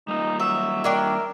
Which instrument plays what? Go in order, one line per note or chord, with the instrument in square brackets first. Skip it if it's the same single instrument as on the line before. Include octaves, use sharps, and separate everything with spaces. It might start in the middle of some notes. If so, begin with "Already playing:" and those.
[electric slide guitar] G3 A#3 F4 [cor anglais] D#4
[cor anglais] F#3 [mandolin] E5
[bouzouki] C#4 D4 G5 [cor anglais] A#4